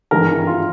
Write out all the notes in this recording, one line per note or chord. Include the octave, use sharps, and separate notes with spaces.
G#1 G2 E3 A#4
F4